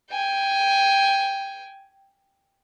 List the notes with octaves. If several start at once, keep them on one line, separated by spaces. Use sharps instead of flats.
G5 G#5